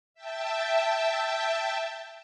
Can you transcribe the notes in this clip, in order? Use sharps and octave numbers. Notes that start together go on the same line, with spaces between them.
E5 G5 A5